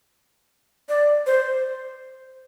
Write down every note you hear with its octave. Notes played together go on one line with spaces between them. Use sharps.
D5
C5